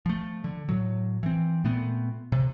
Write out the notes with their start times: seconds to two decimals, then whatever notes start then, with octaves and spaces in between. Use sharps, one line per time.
0.06 F3 A3
0.44 D3
0.69 A2 F#3
1.23 E3 C4
1.64 A#2 A3 B3 C4
2.32 C3